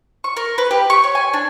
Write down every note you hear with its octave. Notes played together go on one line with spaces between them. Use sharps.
C#6
A#4
B4
G4
C#6
C#5
G#5
D4